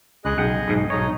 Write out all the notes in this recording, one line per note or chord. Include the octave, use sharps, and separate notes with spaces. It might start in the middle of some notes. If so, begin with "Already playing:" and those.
C#2 G#4 D#5 F#6
B1 G#4 D#5 F#5 G5
B1 G#2
B1 D#4 C#5 D#5